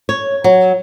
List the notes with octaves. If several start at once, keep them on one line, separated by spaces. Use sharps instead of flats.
C#5
F#3